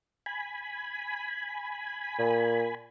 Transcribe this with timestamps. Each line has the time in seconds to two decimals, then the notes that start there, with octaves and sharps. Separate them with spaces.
0.26 G#5 B5
2.19 A#2